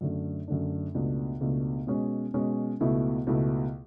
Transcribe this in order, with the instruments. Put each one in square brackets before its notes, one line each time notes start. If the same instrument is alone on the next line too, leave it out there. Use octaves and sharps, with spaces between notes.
[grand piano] F#2 D3 A3 D4
F#2 D3 A3 D4
C#2 B2 A3 D4
C#2 B2 A3 D4
B2 G#3 C#4
B2 G#3 C#4
C#2 B2 A3 E4
C#2 B2 A3 E4